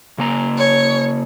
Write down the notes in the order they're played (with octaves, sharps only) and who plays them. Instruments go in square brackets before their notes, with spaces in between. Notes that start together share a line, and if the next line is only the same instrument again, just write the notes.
[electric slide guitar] C#3 A#3 A#5
[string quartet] C#5